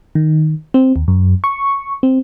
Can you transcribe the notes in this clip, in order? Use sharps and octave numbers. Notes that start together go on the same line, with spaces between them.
D#3
C4
D#2
F#2
C#6
C4